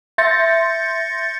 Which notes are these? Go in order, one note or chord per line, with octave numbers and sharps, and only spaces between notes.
E5 C6 G6 A6 A#6 C#7